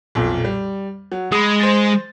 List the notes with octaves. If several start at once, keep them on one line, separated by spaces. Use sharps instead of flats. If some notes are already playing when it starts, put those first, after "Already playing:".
B1 F2 A#2
G3
F#3
G#3 B5 D#6
C5 A6